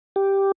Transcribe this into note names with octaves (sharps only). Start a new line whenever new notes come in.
G4